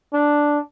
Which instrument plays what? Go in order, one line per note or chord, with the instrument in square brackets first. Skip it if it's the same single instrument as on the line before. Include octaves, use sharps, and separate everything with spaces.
[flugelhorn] D4